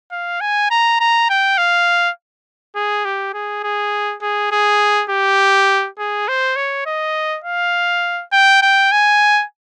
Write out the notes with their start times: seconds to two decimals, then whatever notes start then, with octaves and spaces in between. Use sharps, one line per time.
0.11 F5
0.41 G#5
0.71 A#5
1.00 A#5
1.30 G5
1.58 F5
2.75 G#4
3.05 G4
3.34 G#4
3.64 G#4
4.22 G#4
4.52 G#4
5.10 G4
5.99 G#4
6.28 C5
6.56 C#5
6.86 D#5
7.44 F5
8.32 G5
8.62 G5
8.92 G#5